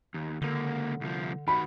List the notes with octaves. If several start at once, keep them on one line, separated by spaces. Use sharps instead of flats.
D#2
C#2 D3 A#3
C2 F3
D#3 F#4 B5